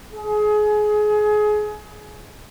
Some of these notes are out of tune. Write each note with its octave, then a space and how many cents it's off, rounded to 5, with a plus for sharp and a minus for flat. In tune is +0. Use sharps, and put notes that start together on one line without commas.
G#4 +25